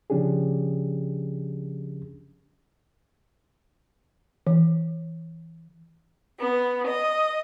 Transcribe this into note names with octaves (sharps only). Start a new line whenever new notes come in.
C#3 F3 C#4 D4 G4 G#4
E3
B3
D#5